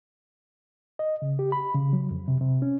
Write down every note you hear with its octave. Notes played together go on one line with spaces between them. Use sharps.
D#5
C#3
G4
B5
C#3
F#3
F2
C3
C3
C#4